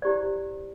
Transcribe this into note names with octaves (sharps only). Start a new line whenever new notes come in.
E4 G4 C5 D5